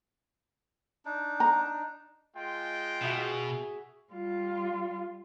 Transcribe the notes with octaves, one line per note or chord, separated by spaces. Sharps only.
D4 D#4
A#5
G#3 F4 G5
B2 F#4 G#4 E5
G3 F4